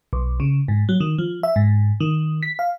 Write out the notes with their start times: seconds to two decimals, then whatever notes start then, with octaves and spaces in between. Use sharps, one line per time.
0.13 B1
0.40 C#3
0.68 G#2
0.89 F#3
1.00 D#3
1.18 F3
1.43 E5
1.56 G#2
2.00 D#3
2.43 B6
2.59 F5